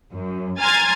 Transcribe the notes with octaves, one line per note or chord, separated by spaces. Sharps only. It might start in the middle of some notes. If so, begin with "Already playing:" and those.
F#2
G#5 A#5 C6 F6 G#6 A6